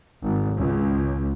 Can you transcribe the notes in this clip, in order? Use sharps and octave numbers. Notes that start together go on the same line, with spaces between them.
G#1
C#2